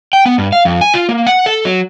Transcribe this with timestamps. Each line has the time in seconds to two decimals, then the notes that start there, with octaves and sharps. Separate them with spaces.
0.13 G5
0.26 B3
0.38 G2
0.52 F5
0.65 F2
0.81 G#5
0.94 F4
1.09 A#3
1.27 F#5
1.46 A4
1.65 F#3